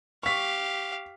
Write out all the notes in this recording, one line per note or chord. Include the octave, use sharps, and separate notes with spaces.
G4 F5 C#6 B6